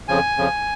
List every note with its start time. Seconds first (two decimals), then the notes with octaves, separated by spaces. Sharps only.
0.08 F2 C#3 F3 G#5
0.37 F2 C#3 F3